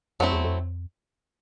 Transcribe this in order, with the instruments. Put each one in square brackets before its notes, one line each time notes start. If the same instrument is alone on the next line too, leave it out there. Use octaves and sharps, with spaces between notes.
[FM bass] F2 [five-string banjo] F#3 A3 C4 E4
[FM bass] E2
F2